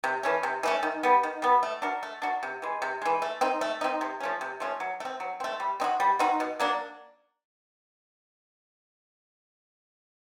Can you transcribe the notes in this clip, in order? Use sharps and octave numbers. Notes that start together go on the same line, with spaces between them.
C3
E3 A3 C#4
C3
E3 A3 C#4
D#3
G3 B3
D#3
G3 B3
A3
D4 F#4 A#4
A3
D4 F#4 A#4
C3
E3 G#3
C3
E3 G#3
A3
C4 D#4
A3
C4 D#4
C3
F3 A3 C#4
C3
F3 A3 C#4
F#3
A3
C4
F#3
A3 C4
G3
C4 D#4 F#4
G3
C4 D#4 F#4
B2
F#3 A#3 D4